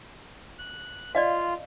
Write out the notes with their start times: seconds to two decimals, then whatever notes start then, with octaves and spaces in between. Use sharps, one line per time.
0.59 F#6
1.15 F4 D5 D#5 F5